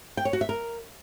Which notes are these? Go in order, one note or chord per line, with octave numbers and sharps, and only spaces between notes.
G5
C#5
F#4
E5
A#4